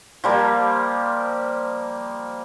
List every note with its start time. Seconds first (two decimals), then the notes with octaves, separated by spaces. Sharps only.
0.24 F3 G3 A#3